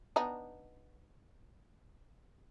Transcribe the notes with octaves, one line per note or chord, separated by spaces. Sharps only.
B3 D4 D#4